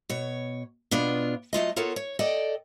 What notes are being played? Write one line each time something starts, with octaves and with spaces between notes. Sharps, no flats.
B2 C#5
B2 B3 D4 F4
F#3 A3 F4 D#5
B3 F4 A4 A#4 C#5
C#5
A4 D5 D#5 G5